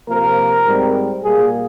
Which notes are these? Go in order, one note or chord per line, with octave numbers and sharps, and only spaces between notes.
C3 F3 A#3 A#4
G#2 G3 C4
A#2 G3 A#3 G#4